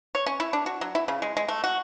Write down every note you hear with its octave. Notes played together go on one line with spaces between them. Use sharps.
C#5
C#4
E4
D4
F#4
F#3
E4
C#3
G#3
G#3
A3
F#4